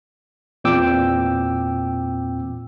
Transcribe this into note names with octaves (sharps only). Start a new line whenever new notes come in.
E2 A#2 C4 G5 D6 E6